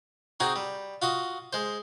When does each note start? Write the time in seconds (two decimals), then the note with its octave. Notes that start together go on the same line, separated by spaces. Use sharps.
0.40 C4 D#4 F#4 G#4
0.56 G3
1.02 F4 F#4 D#5
1.53 G#3 C5